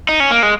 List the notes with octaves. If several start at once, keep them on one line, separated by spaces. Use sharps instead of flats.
D#4
C#4
A#3
G#3